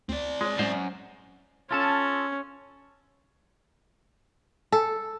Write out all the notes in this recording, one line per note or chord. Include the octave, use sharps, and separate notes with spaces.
D2 C4 D5
G#3 F4 C#5
F#2 A2 G#3 C5
C#4 F4 A4 A5
A4